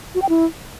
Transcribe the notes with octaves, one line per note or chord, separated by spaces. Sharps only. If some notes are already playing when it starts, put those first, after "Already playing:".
F#4
G5
E4